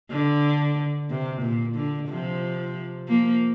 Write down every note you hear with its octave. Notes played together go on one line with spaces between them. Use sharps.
D3
C3
A#2
D3
C3 F3
F3 A#3